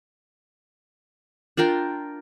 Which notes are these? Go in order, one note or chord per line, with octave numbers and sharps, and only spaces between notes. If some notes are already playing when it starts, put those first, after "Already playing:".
D4 F4 A#4 G5